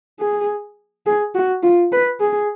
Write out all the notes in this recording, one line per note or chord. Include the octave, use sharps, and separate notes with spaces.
G#4
G#4
F#4
F4
B4
G#4